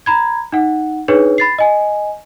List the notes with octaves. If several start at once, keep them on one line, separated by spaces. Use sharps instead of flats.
A#5 B5 G#6
D#4 F#5
D4 D#4 G#4 B4 C#5
B5 A6 C7
D#5 G#5